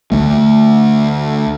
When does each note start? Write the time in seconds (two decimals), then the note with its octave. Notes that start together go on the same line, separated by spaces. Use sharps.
0.12 D2 A3